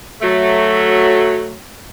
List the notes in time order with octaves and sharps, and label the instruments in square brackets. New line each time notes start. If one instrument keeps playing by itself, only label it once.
[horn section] F#3 A3